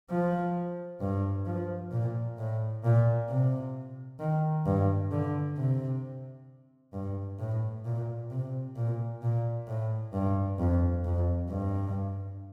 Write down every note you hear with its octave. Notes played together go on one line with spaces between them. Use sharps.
F3
G2
F3
A#2
A2
A#2
C3
D#3
G2
D3
C3
G2
A2
A#2
C3
A#2
A#2
A2
G2
F2
F2
G2